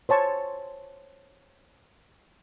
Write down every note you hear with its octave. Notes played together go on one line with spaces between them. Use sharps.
C5 C#5 A5 C#6